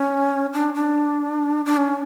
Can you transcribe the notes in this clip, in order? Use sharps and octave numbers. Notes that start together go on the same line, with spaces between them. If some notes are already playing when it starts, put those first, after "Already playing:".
Already playing: C#4
D4
D4
D4
C#4